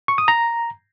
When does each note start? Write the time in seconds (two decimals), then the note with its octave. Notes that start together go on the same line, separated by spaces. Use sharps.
0.08 C#6
0.18 D#6
0.28 A#5